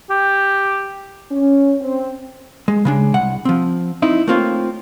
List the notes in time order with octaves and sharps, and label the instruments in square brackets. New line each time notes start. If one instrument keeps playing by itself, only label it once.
[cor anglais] G4
[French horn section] C#4
C4
[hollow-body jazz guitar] G#3
C#3 G#3 D4
C2 F#5
F3 C4
C4 D#4 E4
A3 A#3 C4 F4 C5 C#5